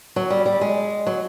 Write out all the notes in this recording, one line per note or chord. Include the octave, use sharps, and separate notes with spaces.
F#3
G3
G3
G#3
F#3